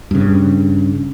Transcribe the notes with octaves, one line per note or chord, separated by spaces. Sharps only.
G2 C#3